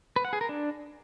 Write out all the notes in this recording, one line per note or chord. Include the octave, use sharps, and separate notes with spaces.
B4
F#5
G#4
A#4
D4